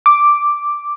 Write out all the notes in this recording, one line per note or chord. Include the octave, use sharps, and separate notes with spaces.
D6